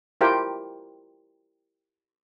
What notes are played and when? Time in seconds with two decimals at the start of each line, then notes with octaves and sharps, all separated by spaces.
0.21 E4 F4 G4 A#4 C5 G5